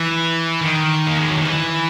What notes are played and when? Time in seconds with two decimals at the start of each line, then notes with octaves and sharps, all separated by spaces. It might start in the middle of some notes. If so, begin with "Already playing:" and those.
Already playing: E3
0.61 D#3
1.07 A#3
1.19 G#3
1.30 F#3
1.42 E3